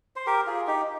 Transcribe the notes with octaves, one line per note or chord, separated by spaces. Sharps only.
C5
G4 A#4
F4 G#4
D#4 G4